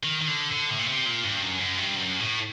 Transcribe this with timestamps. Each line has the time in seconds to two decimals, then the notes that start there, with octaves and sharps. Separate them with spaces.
0.04 D#3
0.22 D#3
0.28 D3
0.52 D3
0.70 A2
0.79 A#2
0.88 C3
1.06 A#2
1.24 G2
1.42 F#2
1.60 F#2
1.78 G2
1.96 F#2
2.20 A2